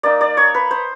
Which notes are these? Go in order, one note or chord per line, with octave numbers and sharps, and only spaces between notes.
A#3 D#4 D5
D5
C#5
B4
C5